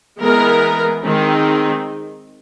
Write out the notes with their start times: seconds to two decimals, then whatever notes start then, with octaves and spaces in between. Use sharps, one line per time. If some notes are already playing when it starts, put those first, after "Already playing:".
0.20 E3 G#3 B3 A#4
1.03 D#3 G#3 C4